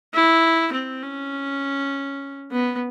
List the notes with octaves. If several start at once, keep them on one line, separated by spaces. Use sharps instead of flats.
E4
C4
C#4
B3